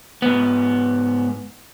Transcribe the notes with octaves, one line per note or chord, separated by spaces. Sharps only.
G#2 B3